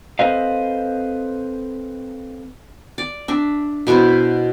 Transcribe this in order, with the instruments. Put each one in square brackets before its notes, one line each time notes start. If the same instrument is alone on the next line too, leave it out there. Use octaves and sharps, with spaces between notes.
[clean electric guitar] C4 A4 B4 C5 D#5 F5
[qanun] D5
D4 E5
B2 E4 B4 C5